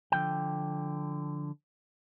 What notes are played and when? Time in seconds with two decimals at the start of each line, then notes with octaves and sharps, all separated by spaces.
0.12 D3 F3 G5